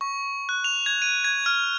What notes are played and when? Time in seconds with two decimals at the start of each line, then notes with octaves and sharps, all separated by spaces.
0.01 C#6
0.49 F#6
0.64 F7
0.86 G#6
1.02 D#7
1.24 G#6
1.46 F6